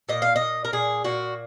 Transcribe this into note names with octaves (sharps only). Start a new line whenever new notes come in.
A#2 D#5
F5
D#5
A#2
A#4
A#2 G#4
A#2 F#4